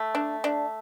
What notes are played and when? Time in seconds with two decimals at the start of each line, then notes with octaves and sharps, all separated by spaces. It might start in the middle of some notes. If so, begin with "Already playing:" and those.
Already playing: A3
0.15 D4
0.44 D4